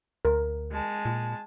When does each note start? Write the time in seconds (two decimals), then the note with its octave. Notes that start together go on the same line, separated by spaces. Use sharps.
0.25 D2 A#4
0.71 G#3 A5
1.05 A#2